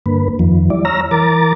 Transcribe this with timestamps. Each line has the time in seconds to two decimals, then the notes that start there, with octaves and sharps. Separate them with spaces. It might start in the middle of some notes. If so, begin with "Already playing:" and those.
0.06 G2 D3 A#3 B4
0.39 F2 D#3 F3
0.70 G3 E4 D5
0.85 C#5 A#5 E6 F6 A#6
1.11 E3 A#4 A#5 D6 A6